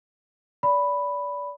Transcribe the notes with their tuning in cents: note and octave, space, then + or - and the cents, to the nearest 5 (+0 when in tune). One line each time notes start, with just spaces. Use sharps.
D5 -30 B5 +0